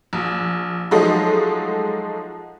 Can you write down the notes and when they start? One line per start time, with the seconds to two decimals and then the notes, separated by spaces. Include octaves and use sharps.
0.13 A#1
0.91 F3 F#3 G#3 A3 D#4